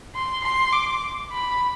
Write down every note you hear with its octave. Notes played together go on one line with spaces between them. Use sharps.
C6
C6
D6
B5